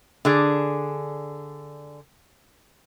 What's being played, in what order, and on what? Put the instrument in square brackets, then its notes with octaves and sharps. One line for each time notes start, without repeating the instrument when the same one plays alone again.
[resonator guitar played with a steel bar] D3 D4 G#4